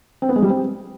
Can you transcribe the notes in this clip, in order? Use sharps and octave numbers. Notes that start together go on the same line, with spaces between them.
C4
B3
G#3
G3
C4